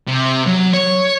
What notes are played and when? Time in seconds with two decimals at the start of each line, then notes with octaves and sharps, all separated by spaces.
0.08 C3
0.47 F#3
0.73 C#5